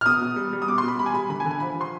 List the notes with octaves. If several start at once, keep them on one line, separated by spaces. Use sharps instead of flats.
F6
B2 D#6
B2
G3
G3
D#6
B2 D6
C6
B2 B5
G3 B5
G#5
G3 B5
D3 B5
G#5
D3
G#5
F3 B5
F3
C6